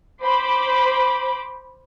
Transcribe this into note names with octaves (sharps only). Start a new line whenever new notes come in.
C5 B5 D6